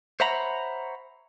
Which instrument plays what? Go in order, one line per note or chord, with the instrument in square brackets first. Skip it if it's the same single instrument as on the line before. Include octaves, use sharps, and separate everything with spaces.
[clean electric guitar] C5 C#5 E5 F#5 A#5 B5